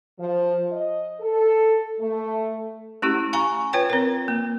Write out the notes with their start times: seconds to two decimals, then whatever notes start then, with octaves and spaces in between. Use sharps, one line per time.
0.19 F3
0.71 D#5
1.20 A4
1.99 A3
3.02 A3 C#4 E4 G4
3.33 F5 G#5 A#5 C#6
3.73 F4 B4 C#5 G5
3.90 C4 A#4
4.28 A#3